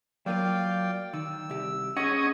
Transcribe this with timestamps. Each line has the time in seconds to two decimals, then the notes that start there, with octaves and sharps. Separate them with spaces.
0.26 F#3 A#3 F4 D5 F5 G5
1.13 D#3 E6
1.50 C2 G4
1.97 C#4 G#4 D#5 F#5